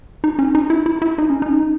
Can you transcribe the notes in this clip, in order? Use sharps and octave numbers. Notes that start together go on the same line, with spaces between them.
D#4
C#4
D#4
E4
E4
E4
D#4
C#4
D#4